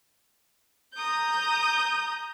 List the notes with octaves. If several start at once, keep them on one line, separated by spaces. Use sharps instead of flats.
A#5 D#6 G6